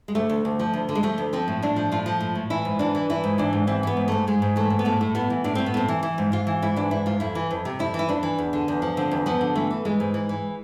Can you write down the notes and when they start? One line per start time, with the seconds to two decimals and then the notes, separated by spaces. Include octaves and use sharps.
0.08 G#3
0.15 D2 A3
0.29 D2
0.45 D2
0.59 F3
0.74 D2
0.89 D3
0.95 G#3
1.03 F3 A3
1.18 D2
1.33 F3 C4
1.48 A2
1.62 A2 D4
1.76 F3
1.92 A2 F4
2.06 F3
2.20 A2
2.35 A2
2.50 E3 E4
2.65 G#2
2.79 E3 D4
2.95 E3
3.10 E3 E4
3.24 G#2
3.38 E3 D4
3.53 G#2
3.67 E3 C4
3.83 E3 B3
3.97 G#2
4.08 G#2 A3
4.27 G#2 G#3
4.42 G#2
4.56 E3 A3
4.70 G#2
4.79 B3
4.85 A2 A3
5.01 A2
5.15 A2 B3
5.30 E3
5.44 A2 D4
5.55 A2 C4
5.66 B3
5.74 A2 C4
5.88 E3
6.03 E3
6.18 G#2
6.32 G#2 F4
6.47 E3
6.62 G#2 E4
6.76 E3 D4
6.91 G#2 E4
7.06 G#2 F4
7.20 F2 E4
7.35 E3
7.51 F2
7.65 C3
7.79 F2 E4
7.94 E3
7.99 E4
8.09 F2 D4
8.23 E3
8.39 E2
8.53 D3
8.68 E2
8.82 F3
8.97 D3 C4
9.11 E2
9.26 F3 B3
9.41 D3
9.55 E3 A3
9.71 E3
9.85 E3 G#3
10.00 G#2
10.14 E3
10.29 E3